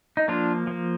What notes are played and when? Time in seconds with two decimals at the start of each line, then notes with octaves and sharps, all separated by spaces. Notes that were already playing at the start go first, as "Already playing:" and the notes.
0.17 D#4
0.28 F3 A#3 D4 F4
0.67 F3 A#3